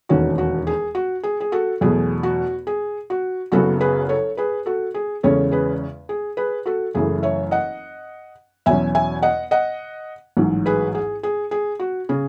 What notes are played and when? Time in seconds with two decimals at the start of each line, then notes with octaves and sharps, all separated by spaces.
0.09 E1 D#2 D#3 A3 C#4 F#4
0.38 F#4
0.67 G#4
0.95 F#4
1.23 G#4
1.41 G#4
1.52 F#4 A4
1.81 E2 B2 F#3 A3 G#4
2.23 F#4
2.67 G#4
3.10 F#4
3.52 F#1 F#2 C#3 F#3 B3 F#4 A4
3.81 G#4 B4
4.09 A4 C#5
4.37 G#4 B4
4.66 F#4 A4
4.94 G#4
5.23 E2 C#3 G#3 C#4 A4 C#5
5.51 G#4 B4
6.09 G#4
6.37 G#4 B4
6.66 F#4 A4
6.95 F#1 F#2 E3 A3 G#4
7.23 C#5 E5
7.51 D#5 F#5
8.66 E2 B2 F#3 C#4 E5 G#5
8.95 E5 G#5
9.22 D#5 F#5
9.51 D#5 F#5
10.37 A1 G#2 F#3
10.66 G#4 B4
10.95 G#4
11.23 G#4
11.51 G#4
11.79 F#4
12.09 C#3 G#4